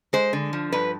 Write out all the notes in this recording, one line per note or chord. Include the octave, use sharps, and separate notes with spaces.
G#3 C5
D3
F3
G2 B4